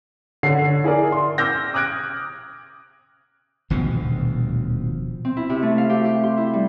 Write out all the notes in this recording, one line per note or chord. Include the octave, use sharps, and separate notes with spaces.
D3 C#5 C7
E4 G#4 A#4 D5
C6
D6 E6 F6 G6 A#6
D6 D#6 F6 F#6 G#6 D7
D#1 D2 B2 F3
C4
E4
C3
A3
F5
G4
G4
C6
E4
G3